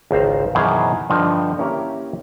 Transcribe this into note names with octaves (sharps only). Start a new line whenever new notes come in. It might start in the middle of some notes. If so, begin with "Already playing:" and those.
G#1 C#2 C5 A#5
F#2 B2 D#3 E3 G#4 G5
G2 D3 F3 D#4
A#3 C#4 E4 G4 A#4